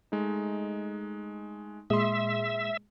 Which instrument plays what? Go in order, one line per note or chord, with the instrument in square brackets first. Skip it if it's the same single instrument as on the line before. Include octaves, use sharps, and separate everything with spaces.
[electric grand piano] G#3 A3 D#4
[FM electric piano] A#2 G#3 [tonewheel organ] E5 [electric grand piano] C6 D#6